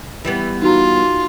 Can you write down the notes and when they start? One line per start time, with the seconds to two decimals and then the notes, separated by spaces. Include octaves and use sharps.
0.25 E3 G3 B3
0.62 D#4 F4 F#4 A#5